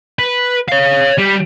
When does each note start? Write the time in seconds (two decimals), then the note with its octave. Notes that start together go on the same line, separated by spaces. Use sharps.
0.19 B4
0.69 C#5 F5
1.18 G3